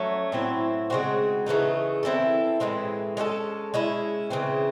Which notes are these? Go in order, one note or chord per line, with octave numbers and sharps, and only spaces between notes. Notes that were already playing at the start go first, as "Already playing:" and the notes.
Already playing: F#3 A3 C#4
A2 F#3 C4 E4
C#3 G#3 C4 F#4
C#3 E3 A3 D#4
E3 C4 E4 A4
A2 E3 G#3 C4
G#3 C#4 F#4 A4
G#3 C#4 E4
C#3 E3 C4